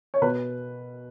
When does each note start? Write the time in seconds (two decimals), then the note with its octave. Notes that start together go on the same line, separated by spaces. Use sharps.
0.14 C#5
0.22 B2 B4